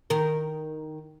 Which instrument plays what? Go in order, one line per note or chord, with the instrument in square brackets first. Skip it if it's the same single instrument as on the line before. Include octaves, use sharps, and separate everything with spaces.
[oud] D#3 A#4